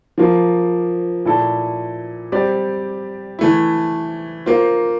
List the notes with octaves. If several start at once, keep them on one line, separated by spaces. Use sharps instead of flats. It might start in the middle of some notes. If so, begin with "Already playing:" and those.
F3 A#3 F4
A#2 A3 E4 A4
G3 C4 G4 D5
E3 A3 E4
A#3 F4 C5